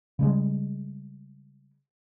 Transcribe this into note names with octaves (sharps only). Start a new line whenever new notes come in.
C#3 G3 G#3